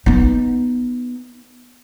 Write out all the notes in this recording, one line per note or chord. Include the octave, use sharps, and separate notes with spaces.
B3 D#4